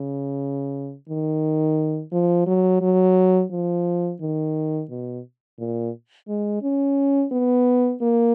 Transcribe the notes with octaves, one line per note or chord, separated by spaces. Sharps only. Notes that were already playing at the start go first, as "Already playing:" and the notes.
Already playing: C#3
D#3
F3
F#3
F#3
F3
D#3
B2
A#2
G#3
C#4
B3
A#3